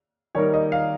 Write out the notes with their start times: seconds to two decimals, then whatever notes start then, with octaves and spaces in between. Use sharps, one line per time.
0.35 D#3 G3 A#3 D#4 A#4 C#5
0.54 D#5
0.72 F5